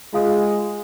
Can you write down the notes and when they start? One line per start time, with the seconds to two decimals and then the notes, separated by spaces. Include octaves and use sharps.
0.14 G#3 F4 F5 D#6